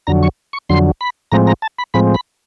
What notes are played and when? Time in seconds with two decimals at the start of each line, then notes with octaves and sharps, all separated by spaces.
0.07 F2 D3 F#3 A#5
0.23 C#6
0.53 C#6
0.69 F2 D3 F#3 C6
1.01 B5
1.32 A2 F3 G#3 C4 A#5
1.47 A#5
1.62 A5
1.78 B5
1.94 A2 F3 G#3 C4 B5
2.14 B5